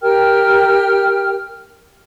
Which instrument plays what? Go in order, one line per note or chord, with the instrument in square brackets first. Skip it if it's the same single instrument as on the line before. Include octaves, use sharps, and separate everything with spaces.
[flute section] G4 A#4 G5 F6